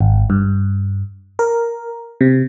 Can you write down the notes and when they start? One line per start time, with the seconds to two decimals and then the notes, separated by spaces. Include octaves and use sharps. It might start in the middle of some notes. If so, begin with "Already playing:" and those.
0.01 G#1
0.30 G2
1.39 A#4
2.21 C3